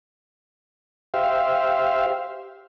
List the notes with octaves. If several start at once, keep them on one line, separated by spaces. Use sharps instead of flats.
G4 C5 E5 F5